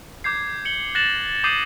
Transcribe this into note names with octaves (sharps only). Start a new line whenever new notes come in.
D6 G6 G#6 C7
C#7 F#7 G7
F#6 A6 A#6 E7 F#7
D6 D#6 G6 C7 D#7 F#7